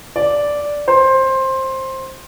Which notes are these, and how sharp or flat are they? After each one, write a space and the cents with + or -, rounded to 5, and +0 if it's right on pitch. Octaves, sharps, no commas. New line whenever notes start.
D5 -5
C5 +15